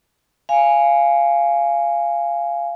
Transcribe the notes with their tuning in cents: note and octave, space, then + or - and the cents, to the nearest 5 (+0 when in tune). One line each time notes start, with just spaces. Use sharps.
F5 -15 G#5 +0